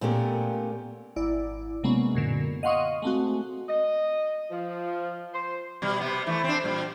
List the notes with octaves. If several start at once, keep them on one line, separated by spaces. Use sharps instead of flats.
A#2 A3 B3 C#4 G4 A#4
G#1 E4 D5
C3 F#3 G#3 A#3 B3 C#4
F#2 A#2 D3
D#5 F5 F#5 C6 C#6 D#6
G#3 A3 C4 F#4
D#5
F3
C5
B2 G3
C3 B3
E3 A3
C4 D4
A#2 G3